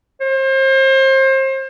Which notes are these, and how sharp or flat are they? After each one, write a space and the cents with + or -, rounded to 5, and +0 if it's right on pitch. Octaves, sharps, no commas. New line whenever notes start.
C5 +35